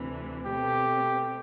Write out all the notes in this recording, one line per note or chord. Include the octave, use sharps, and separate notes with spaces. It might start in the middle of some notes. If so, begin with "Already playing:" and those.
Already playing: D2 C3 E3
B2 A3 C4 G4